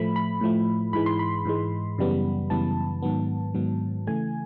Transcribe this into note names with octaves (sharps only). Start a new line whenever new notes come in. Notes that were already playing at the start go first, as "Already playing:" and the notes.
Already playing: A2 F3 A3 B5
B5
A2 F3 A3
G#2 E3 G#3 B5
C6
B5
G#2 E3 G#3
F#2 C#3 E3 G3 B3
F#2 C#3 E3 G3 B3 A5
G#2 D#3 F#3 B3
G#2 D#3 F#3 B3
C#3 E3 A3 G#5